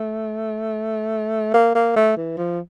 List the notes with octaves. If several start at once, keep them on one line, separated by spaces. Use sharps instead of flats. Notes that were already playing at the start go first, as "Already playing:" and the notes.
Already playing: A3
A#3
A#3
A3
E3
F3